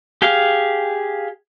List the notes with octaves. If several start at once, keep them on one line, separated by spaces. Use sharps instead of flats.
G4 G#4 F5